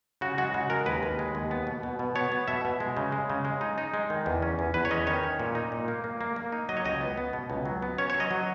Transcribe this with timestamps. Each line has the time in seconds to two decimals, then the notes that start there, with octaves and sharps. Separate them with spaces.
0.21 C#3 F#4
0.38 G#3 F#4
0.54 C#3 F#4
0.70 G#3 A#4
0.86 D#2 B4
1.03 D#2
1.19 G#3
1.35 D#2
1.51 B3
1.67 B2
1.83 B2
1.99 B2
2.15 B3 C#5
2.32 B3
2.48 B2 E5
2.65 B2
2.80 G#3
2.97 C#3
3.12 G#3
3.30 C#3
3.45 G#3
3.61 D#4
3.78 D#4
3.94 G#3
4.10 D#3
4.26 E2
4.42 C#4
4.59 E2
4.74 E2 B4
4.85 C#5
4.91 C#4 D#5
5.07 D#3 C#5
5.23 C#4
5.40 A#2
5.55 D#4
5.72 A#2
5.88 A#3
6.04 A#3
6.21 A#3
6.36 A#3
6.52 D#4
6.69 F#3 D#5
6.77 C#5
6.85 C#2 D#5
7.01 B3
7.17 B3
7.33 B2
7.50 C#2
7.65 F#3
7.82 B3
7.98 C#4 C#5
8.10 F#3 C#5
8.20 D#5
8.31 F#3